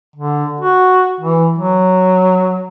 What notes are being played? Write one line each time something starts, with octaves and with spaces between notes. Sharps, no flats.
D3
F#4
E3
F#3